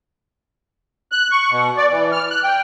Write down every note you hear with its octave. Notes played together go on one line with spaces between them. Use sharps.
F#6
C#6
B2
D5
E3
F6
F#6
G5